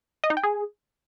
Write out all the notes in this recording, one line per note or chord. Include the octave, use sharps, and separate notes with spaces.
D#5
D#4
G5
G#4